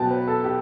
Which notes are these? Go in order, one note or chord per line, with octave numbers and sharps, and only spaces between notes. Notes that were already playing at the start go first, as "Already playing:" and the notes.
Already playing: B2 F#3 B3 G5 A5
B4
A4
G4